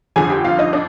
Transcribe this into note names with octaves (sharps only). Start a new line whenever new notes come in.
G1 F2 D3 G#4 G#5
G4 G5
F4 F5
D#4 D#5
D4